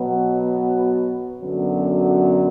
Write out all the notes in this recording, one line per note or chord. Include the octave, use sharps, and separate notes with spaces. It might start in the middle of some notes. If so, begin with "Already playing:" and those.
Already playing: B2 F#3 B3 F#4
F#2 D3 F#3 B3